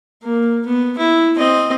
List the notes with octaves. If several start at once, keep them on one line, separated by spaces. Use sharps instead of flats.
A#3
B3
E4
C4 D#5